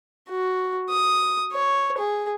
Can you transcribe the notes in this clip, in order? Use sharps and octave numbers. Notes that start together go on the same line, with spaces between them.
F#4
D#6
C#5
G#4